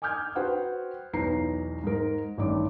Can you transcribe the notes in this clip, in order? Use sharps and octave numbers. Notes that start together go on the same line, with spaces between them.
G#5 D6 D#6 F6 G6 G#6
F#4 B4 C5 F#5 G5
B1 E2 D#4 B4 A#5 C7
G#2 A#4
A1 G2 D#3 D5 D6